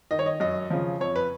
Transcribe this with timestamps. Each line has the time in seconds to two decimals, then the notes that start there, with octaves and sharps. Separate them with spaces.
0.11 D#3 D#5
0.19 C#5
0.26 D#5
0.40 F#2 D#5
0.70 C#3 F3
1.00 F2 C#5
1.16 B4